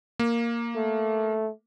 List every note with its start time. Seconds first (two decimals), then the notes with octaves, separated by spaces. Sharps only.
0.19 A#3
0.76 A3